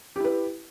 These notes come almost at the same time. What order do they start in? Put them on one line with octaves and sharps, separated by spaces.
G4 E4 B4